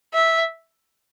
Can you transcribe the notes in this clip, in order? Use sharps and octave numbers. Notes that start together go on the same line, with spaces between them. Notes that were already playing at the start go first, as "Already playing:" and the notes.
E5